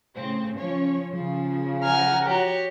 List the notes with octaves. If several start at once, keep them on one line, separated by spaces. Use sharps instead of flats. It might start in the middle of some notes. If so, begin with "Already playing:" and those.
A2 C#3 C4
F3 C#4 C#5
C#3 F3
F#5 G#5 A#5 F6
F#4 G4 C#5